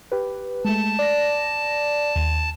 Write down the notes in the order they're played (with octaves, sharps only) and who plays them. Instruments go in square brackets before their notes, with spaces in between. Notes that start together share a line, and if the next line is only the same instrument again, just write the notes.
[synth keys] G4 B4
[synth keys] G#3 A3 [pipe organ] A5
[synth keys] D5 A#6
D#2